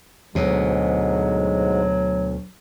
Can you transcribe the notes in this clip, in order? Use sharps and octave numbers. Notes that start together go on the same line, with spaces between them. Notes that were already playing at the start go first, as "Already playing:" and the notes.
D2 G#2 B2 F#3 G#3